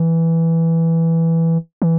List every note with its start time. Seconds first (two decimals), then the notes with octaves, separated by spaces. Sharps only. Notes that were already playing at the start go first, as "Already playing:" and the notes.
Already playing: E3
1.82 E3